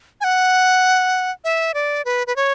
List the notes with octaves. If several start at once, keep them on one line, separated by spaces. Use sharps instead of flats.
G#5
F#5
E5
D5
B4
B4
C#5